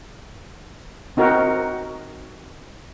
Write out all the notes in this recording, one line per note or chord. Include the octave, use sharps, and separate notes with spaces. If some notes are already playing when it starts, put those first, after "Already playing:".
C4 D#4 F#4 A#4